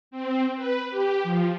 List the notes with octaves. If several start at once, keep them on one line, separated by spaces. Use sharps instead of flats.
C4
B4
G4
F3